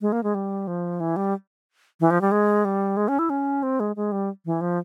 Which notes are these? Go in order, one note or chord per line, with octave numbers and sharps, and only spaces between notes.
G#3
A#3
G#3
G3
F3
E3
G3
E3
F3
G3
G#3
G3
G#3
C#4
E4
C#4
C4
G#3
G#3
G3
E3
F3